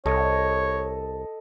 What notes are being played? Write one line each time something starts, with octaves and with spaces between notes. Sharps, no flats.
C2 A4 C#5 D#5